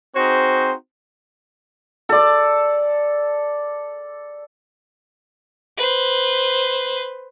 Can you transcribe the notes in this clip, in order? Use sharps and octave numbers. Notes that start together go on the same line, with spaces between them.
C4 D#4 F#4 G#4 C5
A4 D5
B4 C5